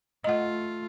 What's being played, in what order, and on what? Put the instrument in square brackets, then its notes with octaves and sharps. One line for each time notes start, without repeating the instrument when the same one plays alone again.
[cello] A3 F4 [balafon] D#5 F#5